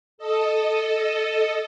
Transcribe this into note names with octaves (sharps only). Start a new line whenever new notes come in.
A4 D#5